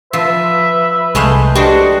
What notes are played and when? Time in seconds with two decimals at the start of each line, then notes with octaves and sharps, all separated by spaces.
0.13 F3 B4 E5
1.15 C2 G#3 A3 F5 G#5 G6
1.55 D4 F#4 G4 C5 D#5